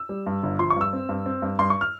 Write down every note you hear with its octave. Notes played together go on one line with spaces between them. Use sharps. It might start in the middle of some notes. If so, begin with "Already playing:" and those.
Already playing: E6
G3
G2
G1
F3 C6
C#6
G2 E6
C4
G2
C4
G2
G2 C6
C#6
F6